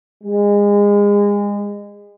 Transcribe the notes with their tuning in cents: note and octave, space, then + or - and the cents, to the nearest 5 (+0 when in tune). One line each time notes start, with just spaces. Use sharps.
G#3 -30